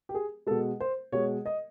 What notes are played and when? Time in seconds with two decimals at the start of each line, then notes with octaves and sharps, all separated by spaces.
0.09 G4
0.14 G#4
0.47 B2 G#3 A4
0.80 C5
1.12 B2 G#3 C#5
1.46 D#5